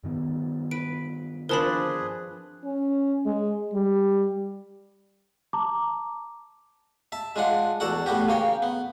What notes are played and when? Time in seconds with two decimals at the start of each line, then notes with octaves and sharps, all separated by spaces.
0.04 G2 D#3 B3
0.71 B4 D7
1.49 F3 C4 D4 G#4 A#4 B4 A5 B5
2.64 C#4
3.26 G#3
3.73 G3
5.53 A5 A#5 D6
7.12 E5 A5
7.36 G#3 D4 F4 F#5
7.80 E2 F#4 A4 D5 F#5
8.06 A2 B3 F#4 G4
8.28 C#3 A#3 C#5 G5
8.62 B3